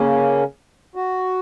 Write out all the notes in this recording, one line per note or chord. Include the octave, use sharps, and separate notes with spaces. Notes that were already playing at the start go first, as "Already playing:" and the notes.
Already playing: C#3 A#3 C#4
F#4